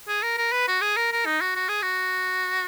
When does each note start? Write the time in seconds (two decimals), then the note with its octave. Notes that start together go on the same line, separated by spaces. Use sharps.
0.08 G#4
0.23 A#4
0.38 A#4
0.52 B4
0.68 F#4
0.81 G#4
0.97 A#4
1.12 A#4
1.26 D#4
1.41 F#4
1.56 F#4
1.69 G#4
1.82 F#4